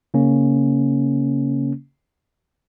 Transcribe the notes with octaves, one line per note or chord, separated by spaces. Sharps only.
C#3 A#3 C#4